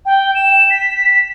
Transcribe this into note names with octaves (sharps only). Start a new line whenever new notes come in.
G5
E7
B6